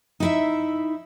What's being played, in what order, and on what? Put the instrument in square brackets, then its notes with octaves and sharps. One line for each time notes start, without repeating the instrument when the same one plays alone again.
[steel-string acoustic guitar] D#4 E4 E5